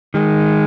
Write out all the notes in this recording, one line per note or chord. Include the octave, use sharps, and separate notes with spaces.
D#3 G#3